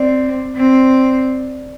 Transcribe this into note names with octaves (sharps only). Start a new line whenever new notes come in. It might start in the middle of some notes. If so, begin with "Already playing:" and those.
Already playing: C4 D5
C4